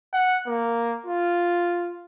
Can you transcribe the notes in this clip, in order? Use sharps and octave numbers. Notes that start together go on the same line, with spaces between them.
F#5
A#3
F4